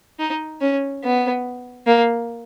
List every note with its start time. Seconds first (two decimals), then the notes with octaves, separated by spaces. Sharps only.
0.19 D#4
0.61 C#4
1.03 B3
1.87 A#3